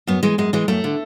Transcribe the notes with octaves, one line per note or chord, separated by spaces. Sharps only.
F#2 B3
E3 G#3
F#2 G#3
E3 G#3
F#2 A3
D3